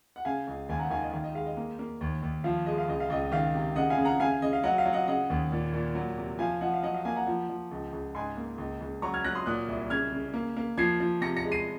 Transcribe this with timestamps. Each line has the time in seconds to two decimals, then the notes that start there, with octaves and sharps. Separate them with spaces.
0.16 F#5
0.25 C#3 F5 G#5
0.47 C#2
0.69 D#2 F5 G#5
0.79 F#5 A#5
0.90 D#3 F5 G#5
1.03 D#5
1.13 D#3 F5
1.24 D#5
1.35 G#3 F5
1.46 D#5
1.57 A#3
1.79 A#3
2.01 D#2
2.22 D#2
2.44 F3 F5
2.66 G#3 D#5
2.78 F5
2.88 C#2 D#5
3.00 F5
3.10 C#2 D#5
3.32 D#3 F5
3.55 C3
3.76 C#3 D#5 F#5
3.90 F5 G#5
3.98 C#3
4.05 F#5 A#5
4.20 C#3 F5 G#5
4.31 F5
4.42 C#3 D#5
4.53 F5
4.63 F#3 D#5 F#5
4.78 F5
4.85 F#3
4.93 D#5 F#5
5.07 C#3 D#5 F#5
5.30 D#2
5.52 A#2
5.73 A#2
5.95 F#3
6.18 C3
6.39 F3 F5 G#5
6.61 F3 D#5 F#5
6.74 F5
6.83 F#3 D#5 F#5
6.94 F5
7.05 A#3 F5 G#5
7.16 F#5 A#5
7.27 F3
7.50 F3
7.71 C#2
7.93 C#2
8.15 G#2 G#5 C6
8.37 A#3
8.58 C#2
8.81 C#2
9.02 F#3 A#5 C#6
9.14 F6 G#6
9.24 F#3 F#6 A#6
9.35 C6 D#6
9.46 A#2 D#6 F#6
9.68 C2
9.90 C#3 F6 G#6
10.12 C#3
10.34 A#3
10.57 A#3
10.78 F3 G#6 C7
11.00 F3
11.21 C3 A#6 C#7
11.37 A#6 C#7
11.44 G#3
11.52 C7 D#7